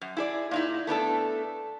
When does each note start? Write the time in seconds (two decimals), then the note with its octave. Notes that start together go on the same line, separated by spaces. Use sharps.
0.01 F#2
0.17 E4 G#4 D5
0.51 A#2 D#4 E4
0.87 A3 B3 D4 A4